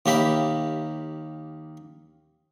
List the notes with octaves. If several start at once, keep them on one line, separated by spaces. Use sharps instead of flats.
D#2 A#3 G4 E5 B5